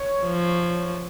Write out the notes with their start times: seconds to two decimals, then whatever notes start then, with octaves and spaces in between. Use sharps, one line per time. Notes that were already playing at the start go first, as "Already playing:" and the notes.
Already playing: C#5
0.24 F3